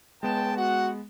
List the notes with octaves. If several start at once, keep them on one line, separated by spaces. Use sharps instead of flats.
C#2 G#3 B3 G5 A5 E7
F#4 F#5